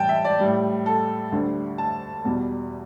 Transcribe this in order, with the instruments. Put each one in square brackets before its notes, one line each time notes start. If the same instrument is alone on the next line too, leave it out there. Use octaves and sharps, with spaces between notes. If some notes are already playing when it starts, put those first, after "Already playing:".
Already playing: [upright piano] A2 E3 G3 G5 A5
E5
D5
A2 G3
A4
D2 D3 G3
A5
E2 B2 G3